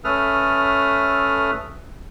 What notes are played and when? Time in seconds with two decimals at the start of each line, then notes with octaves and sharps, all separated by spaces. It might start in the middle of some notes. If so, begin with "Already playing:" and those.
0.04 A3 C#4 A4 B4 D#6 F6